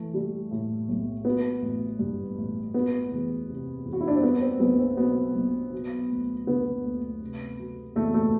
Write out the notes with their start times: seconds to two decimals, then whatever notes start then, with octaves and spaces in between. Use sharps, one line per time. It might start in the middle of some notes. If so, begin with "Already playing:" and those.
Already playing: E3 A3
0.14 G3
0.51 A2
0.89 B1
1.25 F#3 B3
1.62 A1
1.99 G2
2.37 A1
2.74 F#3 B3
3.11 E2
3.49 C3
3.85 E2
3.93 F#4
4.01 E4
4.08 D4
4.16 C4
4.23 G3 B3
4.41 C4
4.60 B1 B3
4.78 C4
4.97 B2 B3
5.35 B1
5.72 F#3
6.10 D2
6.47 D3 B3
6.84 D2
7.22 C3
7.59 F#3
7.95 E2 A3
8.14 A3